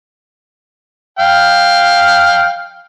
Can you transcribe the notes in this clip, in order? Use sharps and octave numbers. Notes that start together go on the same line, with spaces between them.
F5 G5